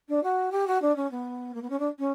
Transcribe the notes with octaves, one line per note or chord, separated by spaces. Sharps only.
D4
F#4
G4
F#4
D4
C#4
B3
A#3
B3
C#4
D4
C#4